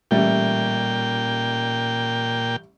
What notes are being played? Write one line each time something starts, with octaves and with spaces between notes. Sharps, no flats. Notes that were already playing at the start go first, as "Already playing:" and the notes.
A1 A#2 G3 A3 G5